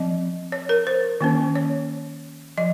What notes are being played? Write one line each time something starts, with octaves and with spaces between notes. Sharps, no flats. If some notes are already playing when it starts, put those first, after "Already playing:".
Already playing: F3 C4 D#5
C#5
A#4
C5
D#3 A#3 C#4
C#5
F3 D#5